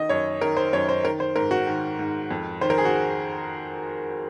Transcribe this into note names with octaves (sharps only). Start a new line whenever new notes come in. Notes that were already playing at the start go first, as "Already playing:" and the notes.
Already playing: D#3 D#5
F#2 C#5
D#3 A#4
C5
F#2 C#5
C5
D#3 A#4
C5
G#2 A#4
F#4
D#3
G#2
F2
D#3 C5
A#4
G#4
F#4